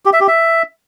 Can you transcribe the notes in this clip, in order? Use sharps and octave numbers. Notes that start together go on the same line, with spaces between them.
G4
E5
G4
E5